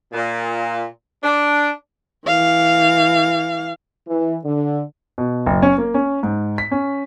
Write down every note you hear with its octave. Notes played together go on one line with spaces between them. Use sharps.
A#2
D4
E3 F5
E3
D3
B2
F#1
C#4
A#3
C#4
G#2
B6
C#4